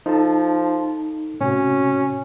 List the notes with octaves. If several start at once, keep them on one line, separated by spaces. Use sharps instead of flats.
F3 D#4 A4 A5
A2 C3 C#4 F#4